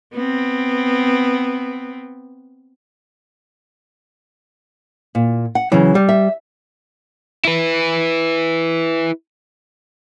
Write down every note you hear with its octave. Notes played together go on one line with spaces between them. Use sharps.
B3 C4
A#2
F#5
C#3 E3 F#3
G3
E5
E4 B4